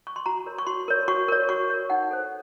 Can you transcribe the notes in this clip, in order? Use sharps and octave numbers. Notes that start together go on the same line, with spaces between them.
C#6
C6
F#4 A#5
A#4 C#5
C#6
F#4 C6
A#4 C#5
F#4 C#6
A#4 C#5
F#4 C#6
A#4 C#5
D#4 F#5
A4 C5